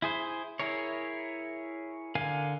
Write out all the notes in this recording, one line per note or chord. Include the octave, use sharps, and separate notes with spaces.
E4 G#4 C5
E4 G#4 A#4 C#5
D3 A#4 F5 G#5